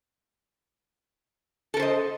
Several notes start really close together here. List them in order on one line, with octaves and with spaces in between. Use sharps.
A4 A#4 C5 D#5